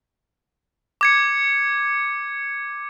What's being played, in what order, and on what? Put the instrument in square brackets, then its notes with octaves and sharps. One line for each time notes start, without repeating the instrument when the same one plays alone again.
[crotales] D6 G#6 C#7